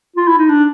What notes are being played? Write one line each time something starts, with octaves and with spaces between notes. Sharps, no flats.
F4
E4
D#4
D4